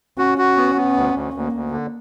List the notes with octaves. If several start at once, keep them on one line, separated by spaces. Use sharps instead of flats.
C#4 F#4
F#4
B3
B3
D2
D2
D2 A#3
D2
D3